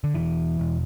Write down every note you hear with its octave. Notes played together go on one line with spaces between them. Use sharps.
D3
E1 E3
E1